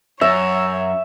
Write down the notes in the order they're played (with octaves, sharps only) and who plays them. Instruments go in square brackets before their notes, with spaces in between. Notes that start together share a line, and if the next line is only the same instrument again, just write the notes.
[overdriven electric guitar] F#2 [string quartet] C#5 [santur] E5